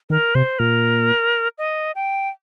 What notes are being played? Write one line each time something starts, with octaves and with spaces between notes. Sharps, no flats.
D#3 A#4
C3 C5
A#2 A#4
D#5
G5